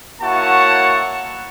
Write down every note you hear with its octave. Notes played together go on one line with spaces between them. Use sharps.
A#3 E4 F#4 C#5 F#5 A5